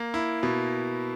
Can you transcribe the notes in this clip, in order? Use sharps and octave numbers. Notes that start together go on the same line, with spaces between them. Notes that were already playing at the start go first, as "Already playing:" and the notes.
Already playing: A#3
E4
B2